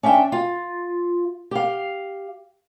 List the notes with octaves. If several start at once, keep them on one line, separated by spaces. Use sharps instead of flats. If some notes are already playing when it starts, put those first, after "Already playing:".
C#4 D4 E5 G5
F4
G4 F5